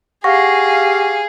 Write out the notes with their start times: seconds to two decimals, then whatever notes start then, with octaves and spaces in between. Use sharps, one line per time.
0.24 G4 G#4 F5 F#5 C#6 A#6